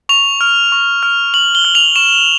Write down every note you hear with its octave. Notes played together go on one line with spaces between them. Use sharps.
C#6 F7
F6
C#6
F6
C#6 F#7
G7
F6
F7
C#6 E7